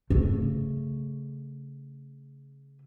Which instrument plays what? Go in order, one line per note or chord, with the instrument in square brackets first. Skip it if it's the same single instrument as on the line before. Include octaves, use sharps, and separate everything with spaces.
[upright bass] C#3 A3